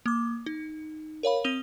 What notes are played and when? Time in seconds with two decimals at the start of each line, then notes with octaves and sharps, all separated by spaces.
0.06 A#3 D6
0.46 D#4
1.23 A#4 C#5 F5 B5
1.44 C4 D#6 D#7 F7 G7